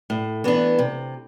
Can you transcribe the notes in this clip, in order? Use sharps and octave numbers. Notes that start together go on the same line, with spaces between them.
A2
E3 B3 D4
C3